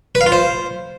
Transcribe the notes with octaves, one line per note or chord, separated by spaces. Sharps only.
B4
F5
F4
C5